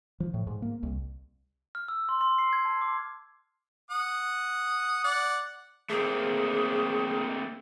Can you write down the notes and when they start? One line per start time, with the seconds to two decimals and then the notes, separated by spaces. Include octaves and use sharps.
0.20 F3
0.34 A2
0.47 G#2
0.62 A#3
0.83 C2
1.75 F6
1.88 E6
2.09 C6
2.21 C6
2.38 C7
2.53 G#6
2.65 A5
2.81 D6
3.90 F#5 D#6
5.04 D5 F#5
5.90 A3 A#3 C4 G#4